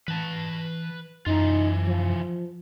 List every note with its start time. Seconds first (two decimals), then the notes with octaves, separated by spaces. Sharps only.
0.08 E3 B4 A5
1.26 F#2 E3 D#4 F4
1.86 F3